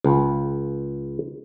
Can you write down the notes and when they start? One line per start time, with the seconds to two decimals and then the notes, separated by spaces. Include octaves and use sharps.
0.04 C#2